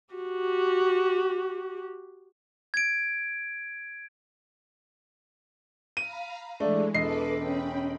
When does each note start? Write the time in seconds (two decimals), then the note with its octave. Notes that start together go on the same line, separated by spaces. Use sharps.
0.14 F#4 G4
2.74 G#6 D7
5.97 F5 A#5 B5 D#7
6.60 E3 G#3 A3 D4
6.94 E1 A4 B4 D#5 D6 C7
7.38 C#4 G5 B5